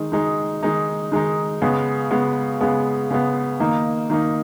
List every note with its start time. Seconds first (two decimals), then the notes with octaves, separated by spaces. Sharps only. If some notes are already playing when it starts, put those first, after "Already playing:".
Already playing: D#3 G#3 D#4
0.12 D#3 G#3 D#4
0.63 D#3 G#3 D#4
1.12 D#3 G#3 D#4
1.62 C#3 G#3 B3
2.11 C#3 G#3 B3
2.61 C#3 G#3 B3
3.10 C#3 G#3 B3
3.60 D#3 A#3 D#4
4.10 D#3 A#3 D#4